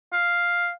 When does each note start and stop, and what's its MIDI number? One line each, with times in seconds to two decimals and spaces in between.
0.13 0.70 77